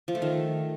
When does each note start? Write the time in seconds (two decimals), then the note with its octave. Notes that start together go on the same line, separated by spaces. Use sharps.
0.08 F3
0.15 A3
0.22 D#3